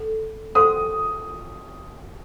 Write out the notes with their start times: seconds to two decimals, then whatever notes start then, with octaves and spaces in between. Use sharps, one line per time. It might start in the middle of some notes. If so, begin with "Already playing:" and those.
Already playing: A4
0.55 A4 C5 F#5 C6 D#6